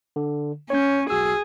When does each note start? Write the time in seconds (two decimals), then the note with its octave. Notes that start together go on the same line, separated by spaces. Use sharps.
0.16 D3
0.70 C#4 C#5 G6
1.10 B1 F#4 G#4 E6